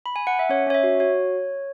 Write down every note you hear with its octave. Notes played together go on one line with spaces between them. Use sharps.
B5
G#5
F#5
E5
C#4 C#5
C#4 C#5
E5
F#4
F#4 C#5